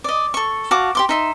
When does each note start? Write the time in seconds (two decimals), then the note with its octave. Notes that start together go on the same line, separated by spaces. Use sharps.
0.04 D5 D#5
0.34 A4 C#6
0.71 F#4 F5 A5 D6
0.95 G4 C6 D6
1.09 D#4 E5 C6